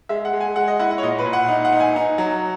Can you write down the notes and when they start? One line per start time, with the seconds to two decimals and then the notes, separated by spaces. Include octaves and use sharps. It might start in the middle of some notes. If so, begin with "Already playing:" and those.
0.09 G#3 E5
0.25 F#5
0.33 G#3
0.41 G#5
0.56 G#3 F#5
0.68 D#5
0.79 E4 F#5
0.91 F#5
0.98 C#5
1.02 A#2 D#5
1.18 B4
1.26 A#2
1.33 F#5
1.48 D#4
1.65 F#5
1.72 D#4
1.80 G#5
1.96 D#4
2.18 F#3